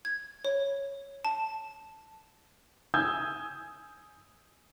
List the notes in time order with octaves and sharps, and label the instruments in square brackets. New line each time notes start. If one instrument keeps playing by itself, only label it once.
[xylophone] G#6
C#5
A5
[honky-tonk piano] G#5 D#6 E6 G6 G#6